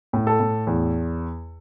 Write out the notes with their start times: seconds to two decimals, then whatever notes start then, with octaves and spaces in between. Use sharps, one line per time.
0.13 A2
0.27 A4
0.40 A2
0.67 E2